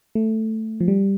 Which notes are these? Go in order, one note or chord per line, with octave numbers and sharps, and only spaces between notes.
A3
F3
G3